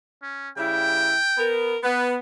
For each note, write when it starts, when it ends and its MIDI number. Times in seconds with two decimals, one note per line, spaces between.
0.23 0.50 61
0.57 1.14 49
0.57 1.14 55
0.57 1.14 64
0.57 1.53 79
1.37 1.75 59
1.37 1.75 70
1.83 2.14 59
1.83 2.09 71